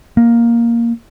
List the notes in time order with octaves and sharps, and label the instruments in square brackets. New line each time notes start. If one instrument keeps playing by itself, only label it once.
[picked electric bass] A#3